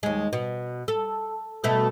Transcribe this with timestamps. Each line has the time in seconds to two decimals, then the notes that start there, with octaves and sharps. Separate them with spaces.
0.03 D#2 G#3
0.33 B2
0.88 A4
1.64 B2 A3 A4